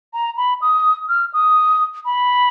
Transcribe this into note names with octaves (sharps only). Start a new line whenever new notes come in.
A#5
B5
D#6
F6
D#6
B5